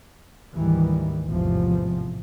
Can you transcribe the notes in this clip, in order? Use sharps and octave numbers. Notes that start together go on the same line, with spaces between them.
D2 G#2 D#3 E3 G3
A1 E2 G#2 C3 F3